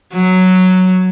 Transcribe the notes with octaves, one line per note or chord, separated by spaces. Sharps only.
F#3